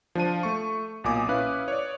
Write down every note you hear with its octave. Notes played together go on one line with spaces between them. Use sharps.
F3 D4 A5 D#7
A3 C#6
B1 A#2 G#5 D6 D#6
C#4 E4 B4 F5 F#6
C#5 D5